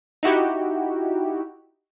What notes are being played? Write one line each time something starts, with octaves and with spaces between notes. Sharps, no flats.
D#4 E4 F#4 G4